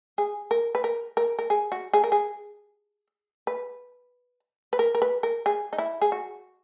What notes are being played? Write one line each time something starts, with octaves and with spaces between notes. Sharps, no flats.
G#4
A#4
B4
A#4
A#4
A#4
G#4
F#4
G#4
A#4
G#4
B4
B4
A#4
A#4
B4
A#4
G#4
D#4
E4
G#4
F#4